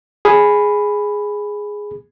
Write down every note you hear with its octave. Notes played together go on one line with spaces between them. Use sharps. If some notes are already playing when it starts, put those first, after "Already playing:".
G#4 B5